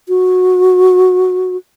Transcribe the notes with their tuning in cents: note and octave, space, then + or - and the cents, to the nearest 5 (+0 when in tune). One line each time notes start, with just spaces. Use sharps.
F#4 -15